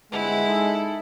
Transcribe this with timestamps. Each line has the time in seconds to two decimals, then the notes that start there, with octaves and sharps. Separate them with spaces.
0.12 G1 G#3 C4 E4 F#5
0.47 D#4 G#4 A4